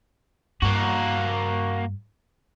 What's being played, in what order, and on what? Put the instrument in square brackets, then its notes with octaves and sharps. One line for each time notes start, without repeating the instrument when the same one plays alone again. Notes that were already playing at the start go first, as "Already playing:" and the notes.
[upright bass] G2 [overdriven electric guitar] A#3 F#4